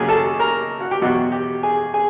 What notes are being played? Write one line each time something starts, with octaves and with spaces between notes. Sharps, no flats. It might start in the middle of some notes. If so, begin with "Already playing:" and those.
Already playing: D#2 C#3 F#3 G4 G#4 G#5
A4 A5
A#4 A#5
F#4 F#5
G4 G5
E2 B2 F#3 F#4 F#5
G4 G5
G#4 G#5
G#4 G#5